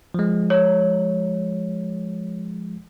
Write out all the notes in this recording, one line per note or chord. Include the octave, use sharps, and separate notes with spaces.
F3 G#3
C#5